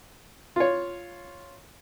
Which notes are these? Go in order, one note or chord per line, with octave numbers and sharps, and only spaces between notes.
F4 C#5